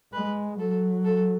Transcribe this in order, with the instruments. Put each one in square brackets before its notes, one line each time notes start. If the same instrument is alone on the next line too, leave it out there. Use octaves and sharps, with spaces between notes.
[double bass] G#3 [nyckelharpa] B4
[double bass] F#3 [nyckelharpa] A4
[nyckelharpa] A4